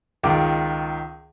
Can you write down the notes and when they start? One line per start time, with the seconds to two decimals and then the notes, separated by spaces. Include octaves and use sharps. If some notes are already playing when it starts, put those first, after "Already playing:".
0.23 C#2 D#3 F4 D6